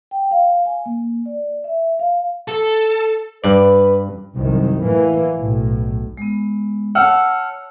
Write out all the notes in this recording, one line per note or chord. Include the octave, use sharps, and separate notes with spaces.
G5
F5
G#5
A#3
D5
E5
F5
A4
G2 B4 D5
C2 F#2 D#3
A2 E3 A#3
B1 A2
G#3 B3
C#5 F#5 A5 E6 F6 C#7